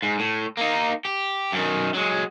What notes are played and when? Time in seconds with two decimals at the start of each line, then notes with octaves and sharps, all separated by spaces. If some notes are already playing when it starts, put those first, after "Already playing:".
0.02 G#2
0.19 A2
0.57 A#3 D#4
1.05 G4
1.52 F#2 D#3
1.94 F#3 G#3